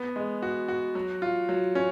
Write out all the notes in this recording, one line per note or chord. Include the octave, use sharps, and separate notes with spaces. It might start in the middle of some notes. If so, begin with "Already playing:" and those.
Already playing: B3
G#3
F#4
F#4
F#3
F4
F#3
C#4